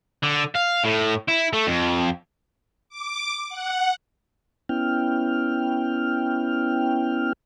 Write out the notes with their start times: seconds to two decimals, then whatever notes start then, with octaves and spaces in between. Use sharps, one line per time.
0.23 D3
0.56 F5
0.85 A2
1.29 E4
1.53 A3
1.67 F2
2.89 D6
3.49 F#5
4.69 B3 C#4 E4 G5 F6